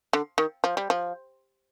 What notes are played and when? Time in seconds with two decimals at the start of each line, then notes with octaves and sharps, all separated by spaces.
0.13 D3
0.38 D#3
0.64 F3
0.77 G3
0.90 F3